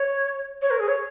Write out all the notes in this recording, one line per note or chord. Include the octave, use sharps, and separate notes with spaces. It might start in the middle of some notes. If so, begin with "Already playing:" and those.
Already playing: C#5
C#5
A#4
G#4
C#5